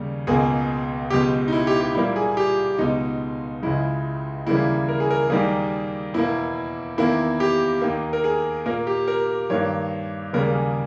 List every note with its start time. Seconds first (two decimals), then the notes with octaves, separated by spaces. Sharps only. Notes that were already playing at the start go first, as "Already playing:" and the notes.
Already playing: D#2 C#3 G3
0.27 C#2 B2 A#3 G#4
1.10 C#2 B2 G#3 G4
1.48 D#4
1.53 E4
1.67 G4
1.81 G4
1.95 A#2 G3 A#3 E4
2.16 G#4
2.37 G4
2.78 C#2 B2 G#3 D#4
3.63 C#2 C#3 G#3 E4
4.46 D#2 C#3 E3 G3 A#3 E4
4.89 A#4
5.00 G#4
5.11 A#4
5.30 D#2 D#3 G3 A#3 G#4
6.14 E2 B2 A#3 E4
6.98 E2 D#3 A#3 E4
7.40 G4
7.82 D#2 D#3 A#3
8.13 A#4
8.24 G#4
8.66 A#2 A#3 A#4
8.87 G4
9.08 A#4
9.50 G2 D#3 A#3 C#5
10.33 D#2 C#3 G3 A#3 A#4
10.54 G#4